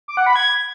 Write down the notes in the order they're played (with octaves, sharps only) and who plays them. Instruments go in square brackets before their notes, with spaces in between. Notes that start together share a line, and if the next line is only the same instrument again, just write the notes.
[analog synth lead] D6
F#5
B5
G#6